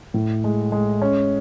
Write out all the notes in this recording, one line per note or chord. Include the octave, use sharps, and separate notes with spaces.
A2
G#3
G#3
C#4